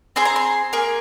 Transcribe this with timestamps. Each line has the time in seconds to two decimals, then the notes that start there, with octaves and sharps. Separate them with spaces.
0.16 C4 G#4 C6
0.25 A#5
0.36 C6
0.73 A#3 G#4